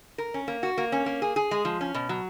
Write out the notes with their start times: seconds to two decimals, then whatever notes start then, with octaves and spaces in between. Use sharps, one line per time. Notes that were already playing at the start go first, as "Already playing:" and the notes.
0.18 A#4
0.34 C#4
0.48 A#3
0.63 F#4
0.78 A#3
0.92 C#4
1.06 A#3
1.22 G#4
1.36 G#4
1.51 G#3
1.65 F3
1.81 C#4
1.94 B2
2.09 F#3